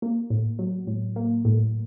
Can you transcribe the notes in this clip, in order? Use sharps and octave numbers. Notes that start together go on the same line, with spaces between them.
A#3
A2
F#3
A2
A#3
A2